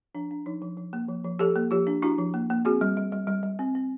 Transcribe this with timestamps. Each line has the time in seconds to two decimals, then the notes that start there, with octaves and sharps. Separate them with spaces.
0.15 F3 D4
0.31 D4
0.46 F3 D#4
0.62 F3
0.77 F3
0.93 A#3
1.08 F3
1.24 F3
1.39 F3 G4 A4
1.56 A#3
1.71 F3 F4 G4
1.87 D4
2.02 D4 E4 F#4
2.18 F3
2.34 A#3
2.50 A#3
2.65 C4 F#4 G#4
2.81 G3
2.97 G3
3.12 G3
3.27 G3
3.43 G3
3.59 C4
3.75 C4